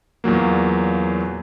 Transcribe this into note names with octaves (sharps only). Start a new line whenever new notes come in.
E2 A#2 F#3 A#3